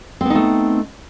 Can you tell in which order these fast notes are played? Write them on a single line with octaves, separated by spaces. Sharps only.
C4 B3 D#4 A3